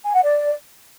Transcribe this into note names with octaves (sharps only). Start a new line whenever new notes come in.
G#5
F#5
D5